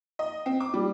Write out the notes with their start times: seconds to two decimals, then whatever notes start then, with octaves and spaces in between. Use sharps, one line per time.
0.19 D#5
0.46 C4
0.60 D6
0.74 G3